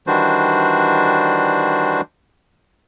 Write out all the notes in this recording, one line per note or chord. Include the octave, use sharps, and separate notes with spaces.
D#3 E3 G3 D4 F#4 C5